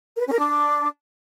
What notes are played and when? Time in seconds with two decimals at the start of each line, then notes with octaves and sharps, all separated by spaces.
0.15 A#4
0.21 B4
0.27 C#4
0.33 A#4
0.39 D4